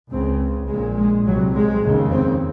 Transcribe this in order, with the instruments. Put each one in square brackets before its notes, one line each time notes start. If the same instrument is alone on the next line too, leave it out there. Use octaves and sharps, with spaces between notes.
[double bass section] C#2 C#3 C4
A#1 A#2 G#3
G#3
C2 C3 F#3
G#3
F1 D#2 C#3
C4